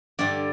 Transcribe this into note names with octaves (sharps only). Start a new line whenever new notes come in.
G2 D3 G3 D5